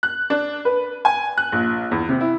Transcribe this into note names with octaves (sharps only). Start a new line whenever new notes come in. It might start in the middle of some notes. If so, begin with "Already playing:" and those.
F#6
D4
B4
G#5
F#6
A#1
E2
C3
E4